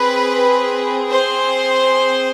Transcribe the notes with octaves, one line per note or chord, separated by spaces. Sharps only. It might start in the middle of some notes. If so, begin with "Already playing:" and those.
Already playing: C4 G#4 B4
C5